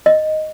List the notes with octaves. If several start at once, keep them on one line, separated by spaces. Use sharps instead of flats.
D#5